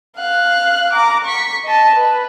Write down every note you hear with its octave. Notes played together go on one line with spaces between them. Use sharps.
F5 F#6
A#5 D6
C#6 B6
D#5 A5
B4